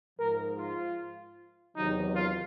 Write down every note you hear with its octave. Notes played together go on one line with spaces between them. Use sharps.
G#2 F3 A#4
F4
E2 C3 D#3 F#3 D#4
F4